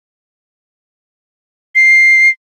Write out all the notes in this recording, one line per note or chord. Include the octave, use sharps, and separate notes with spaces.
C7